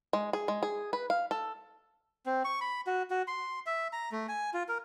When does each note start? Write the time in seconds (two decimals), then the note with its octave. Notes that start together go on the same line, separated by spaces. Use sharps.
0.13 G#3
0.33 G#4
0.48 G#3
0.63 G#4
0.93 B4
1.10 F5
1.31 A4
2.26 C4
2.45 C#6
2.61 B5
2.87 F#4
3.10 F#4
3.28 C6
3.66 E5
3.93 A#5
4.12 A3
4.29 G#5
4.54 F4
4.68 A#4